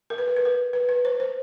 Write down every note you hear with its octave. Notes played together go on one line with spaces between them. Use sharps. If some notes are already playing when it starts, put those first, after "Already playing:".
A#4
B4
A#4
B4
A#4
B4
B4
C5
C5